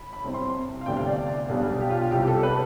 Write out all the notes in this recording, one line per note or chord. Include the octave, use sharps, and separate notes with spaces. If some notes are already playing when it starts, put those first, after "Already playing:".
Already playing: B5
B5
C2 C3 G3 C4
C6
F5
D2 C3 G3 B3 D4 G5
F5
D5
B1 B2 G3 B3 D4
G4
F4
F4
C2 C3 G3 G4
A4
B4